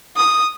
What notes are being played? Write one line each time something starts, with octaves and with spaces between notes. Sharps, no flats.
D#6